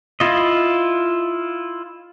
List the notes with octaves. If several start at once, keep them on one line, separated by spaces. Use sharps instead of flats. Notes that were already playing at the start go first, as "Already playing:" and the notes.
E4 F4 D#5